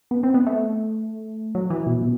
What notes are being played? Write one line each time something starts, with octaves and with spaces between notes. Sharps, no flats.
B3
C4
B3
A3
F#3
E3
B2
B2